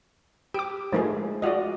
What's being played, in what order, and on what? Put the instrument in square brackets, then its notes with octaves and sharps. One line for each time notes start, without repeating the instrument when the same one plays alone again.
[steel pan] G4 [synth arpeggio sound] D6 D7
[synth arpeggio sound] F3 D#4 A#4 [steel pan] G#3 A3 G#4
[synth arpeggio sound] G#3 F4 D5 [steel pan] F#4 D#5